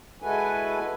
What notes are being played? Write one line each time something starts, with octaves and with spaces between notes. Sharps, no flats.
G#3 E4 F#4 A4 B4 G#5